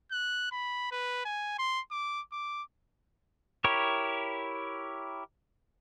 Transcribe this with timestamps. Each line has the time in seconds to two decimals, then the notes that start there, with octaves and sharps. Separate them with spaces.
0.12 F#6
0.52 B5
0.91 B4
1.25 G#5
1.59 C6
1.91 D6
2.32 D6
3.64 E4 G4 A#4 C#5